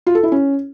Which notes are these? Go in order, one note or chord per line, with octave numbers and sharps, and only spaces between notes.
F4
A4
E4
C#4